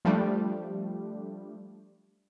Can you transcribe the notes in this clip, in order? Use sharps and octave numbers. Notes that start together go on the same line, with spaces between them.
F3 G3 A3 D4 G4